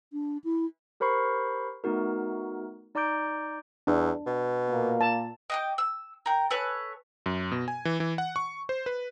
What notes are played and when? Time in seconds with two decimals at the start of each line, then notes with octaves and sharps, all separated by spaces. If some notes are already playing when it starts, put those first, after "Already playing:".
0.13 D4
0.44 E4
1.00 G4 A#4 C5 B5 C#6 C7
1.84 A3 B3 D#4 F#4 A#4
2.95 D#4 D5 A#5 D6 G6 D7
3.87 E2 D4
4.26 B2
4.70 A#2 A#3
5.01 A5
5.50 D#5 G5 D6
5.78 E6
6.26 A#4 G5
6.51 A4 B4 C#5 G#5
7.26 F#2
7.52 B2
7.68 G#5
7.85 E3
8.00 E3
8.18 F#5
8.36 C#6
8.69 C5
8.86 B4